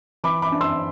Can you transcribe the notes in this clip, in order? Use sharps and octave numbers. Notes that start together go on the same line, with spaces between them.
E3 B5 D6
B5 D6
D4
C6 E6